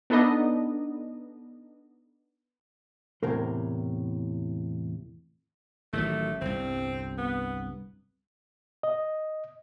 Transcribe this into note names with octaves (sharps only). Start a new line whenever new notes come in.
B3 D4 D#4 A4 B4 D#5
E2 A2 C3 A#4 C5
A1 D#3 F#3 A3
G1 C2 C4
B3
D#5